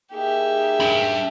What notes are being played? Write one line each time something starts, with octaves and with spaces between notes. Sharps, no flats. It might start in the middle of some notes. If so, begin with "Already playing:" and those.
A#3 D#4 G4 G#4 E5
D4 B5